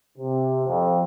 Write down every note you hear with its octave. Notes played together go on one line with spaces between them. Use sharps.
C3
F2